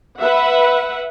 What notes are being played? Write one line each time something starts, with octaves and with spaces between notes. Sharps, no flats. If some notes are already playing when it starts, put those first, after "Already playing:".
B4 E5 F#5